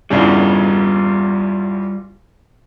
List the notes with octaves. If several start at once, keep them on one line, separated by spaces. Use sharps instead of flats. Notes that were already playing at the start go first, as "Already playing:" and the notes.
E2 G2 C#3 G3 F4